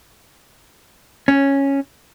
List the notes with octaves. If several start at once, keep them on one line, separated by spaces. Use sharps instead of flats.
C#4